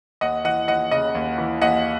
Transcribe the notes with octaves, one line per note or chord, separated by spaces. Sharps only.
D#2 D#5 F#5
E3 D#5 F#5
D#2 D#5 F#5
C#3 D#5
D#2
E3
D#2 D#5 F#5